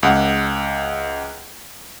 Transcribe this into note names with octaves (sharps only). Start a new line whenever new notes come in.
C#2 F#5